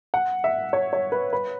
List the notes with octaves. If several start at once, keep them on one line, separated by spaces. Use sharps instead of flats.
F#5
E5
C#5
C#5
B4
B4